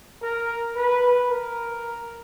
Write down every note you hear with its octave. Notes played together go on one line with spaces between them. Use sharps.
A#4
B4
A#4